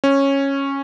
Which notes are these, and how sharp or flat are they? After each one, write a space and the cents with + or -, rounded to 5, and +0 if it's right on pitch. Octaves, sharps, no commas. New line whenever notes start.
C#4 -10